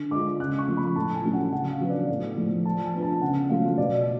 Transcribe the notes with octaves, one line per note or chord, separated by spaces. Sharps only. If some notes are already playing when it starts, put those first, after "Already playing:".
Already playing: D3
G#3 D4 F4 D6
C#3 F#6
C#6
F3 A3 F4
B5
A2 A5
G#5
F#3 A3 C#4
F#5
C#3 F#5
F5
F#3 B3 D4
D5
A2
F3 A3
F3 A5
G#5
B3 D4 F4
A5
C#3 F#5
F#3 A3 F4 F5
B2 D5